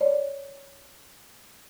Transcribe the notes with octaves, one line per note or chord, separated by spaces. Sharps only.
C#5 D5